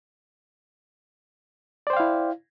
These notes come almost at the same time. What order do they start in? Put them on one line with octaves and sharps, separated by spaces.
D5 C5 G5 F5 E4